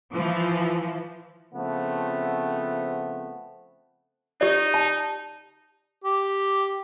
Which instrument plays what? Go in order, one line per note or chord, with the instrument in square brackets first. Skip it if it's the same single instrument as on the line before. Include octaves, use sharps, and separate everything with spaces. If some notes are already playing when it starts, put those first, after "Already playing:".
[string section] E3 F3
[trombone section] C#3 F3 A3 B3 C4
[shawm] D#4 [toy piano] G4 D5
[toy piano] A5
[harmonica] G4